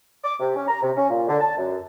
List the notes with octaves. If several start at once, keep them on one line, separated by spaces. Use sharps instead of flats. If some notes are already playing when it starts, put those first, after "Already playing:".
D6
C3
C#4
A#5
C3
C#4
A#2
D3
A5
F#2